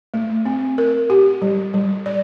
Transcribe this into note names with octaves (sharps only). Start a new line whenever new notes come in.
A3
C4
A#4
G4
G3
G3
D5